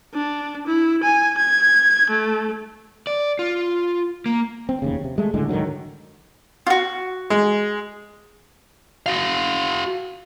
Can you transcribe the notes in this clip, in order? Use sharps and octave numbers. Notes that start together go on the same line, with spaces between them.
D4
E4
G#5
G#6
A3
D5
F4
A#3
C4
F1 D#2 C#3
C3
G#3 A3
C#2 A2 D3 G#3
G#2 D3 D#3 F#3
F4 F#4
G#3
F#4 F5